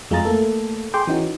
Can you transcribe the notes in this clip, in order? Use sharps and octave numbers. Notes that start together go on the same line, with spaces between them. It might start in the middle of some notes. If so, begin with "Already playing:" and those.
F2 G#3 F4 G#4 A#5 A6
A3 A#3 A4
G#4 G5 C6 D6 G6
E3 C#4 D#4 F#4